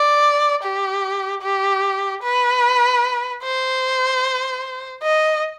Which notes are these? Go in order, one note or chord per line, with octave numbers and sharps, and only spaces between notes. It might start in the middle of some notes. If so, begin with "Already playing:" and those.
Already playing: D5
G4
G4
B4
C5
D#5